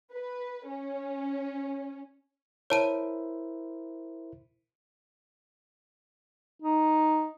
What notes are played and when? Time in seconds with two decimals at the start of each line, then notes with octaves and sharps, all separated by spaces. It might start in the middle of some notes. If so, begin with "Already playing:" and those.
0.13 B4
0.67 C#4
2.70 E4 A#4 C5 C#5 A5 D#7
6.62 D#4